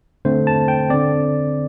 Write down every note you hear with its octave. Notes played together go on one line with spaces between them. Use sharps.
D3 A3 C4 C5
A5
G5
D3 C4 D5